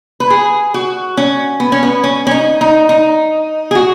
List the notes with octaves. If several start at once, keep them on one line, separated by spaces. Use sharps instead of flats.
B4
G#4
F#4
C#4
B3
C#4
B3
C#4
C#4
D#4
D#4
D#4
G#4
F#4